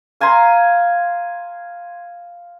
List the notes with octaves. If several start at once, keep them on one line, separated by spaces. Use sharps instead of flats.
F5 G#5 A#5 C6